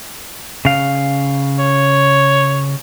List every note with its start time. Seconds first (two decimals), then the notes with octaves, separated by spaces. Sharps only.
0.65 C#3 F5
1.59 C#5